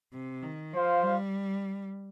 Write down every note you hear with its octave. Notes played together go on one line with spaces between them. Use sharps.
C3
D#3
F3 F4 C5 F5
G3